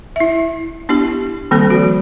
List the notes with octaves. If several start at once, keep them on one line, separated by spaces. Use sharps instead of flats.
E4 E5
B3 D4 E4 G4
D#3 G3 A#3 C4 A4
F3 F#4